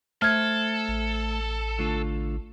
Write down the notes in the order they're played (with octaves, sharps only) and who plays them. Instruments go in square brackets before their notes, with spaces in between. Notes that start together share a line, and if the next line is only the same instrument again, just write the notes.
[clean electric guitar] A3 C5 E5 [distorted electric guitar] A4 [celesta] F6 G#6
[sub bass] A1
[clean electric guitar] D3 A3 F4